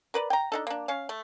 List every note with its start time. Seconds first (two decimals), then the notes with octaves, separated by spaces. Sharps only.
0.14 A#4 B4 D5
0.30 G5 A#5
0.52 D4 D#4 A4
0.67 A#3 D4
0.88 C#4 F5
1.09 A3